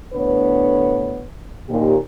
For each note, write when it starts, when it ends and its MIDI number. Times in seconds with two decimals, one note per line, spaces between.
0.14 1.22 38
0.14 1.22 45
0.14 1.22 59
0.14 1.22 62
0.14 1.22 71
0.14 1.22 73
1.69 1.96 39
1.69 1.96 46
1.69 1.96 67